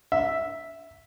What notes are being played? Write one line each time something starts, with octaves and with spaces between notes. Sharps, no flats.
E5